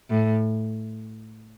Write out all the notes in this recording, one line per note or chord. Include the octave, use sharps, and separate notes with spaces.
A2